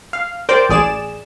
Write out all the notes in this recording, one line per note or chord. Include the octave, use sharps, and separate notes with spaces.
F5
A#4 C5 D5 G5
A1 G#4 D5 E7